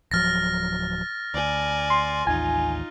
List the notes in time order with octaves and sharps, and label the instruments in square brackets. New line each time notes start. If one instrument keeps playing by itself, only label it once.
[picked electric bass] D1 F3 F#3 [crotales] F6 A6 A#6
[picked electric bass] D2 [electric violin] D5 G#5
[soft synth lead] C6
[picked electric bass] A1 D#2 [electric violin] D#4 F4 [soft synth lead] G#5